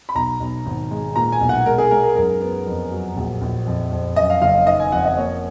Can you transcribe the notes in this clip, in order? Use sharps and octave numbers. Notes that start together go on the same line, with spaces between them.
B5
B1 A#5
B1
G#1
G#3
A#2 A#5
G#5
B1
F#5
G#3 A#4
G#4
G#3 A#4
A#4
F#2 A#4
B3
F2
F#3
A#1
A#1
F2
F2
F#2 D#5
F5
F#1 F5
D#3 D#5
G#5
F2 F#5
D#5
A#3 C#5